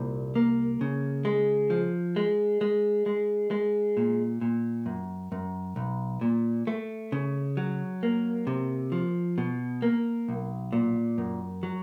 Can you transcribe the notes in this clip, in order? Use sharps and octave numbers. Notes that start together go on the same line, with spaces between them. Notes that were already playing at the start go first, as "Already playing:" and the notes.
Already playing: C2 A#2
A#3
C#3
G#3
F3
G#3
G#3
G#3
G#3
A#2
A#2
F#2
F#2
B1
A#2
A3
C#3
F#3
A#3
C3
F3
B2
A#3
B1
A#2
F#2
F#3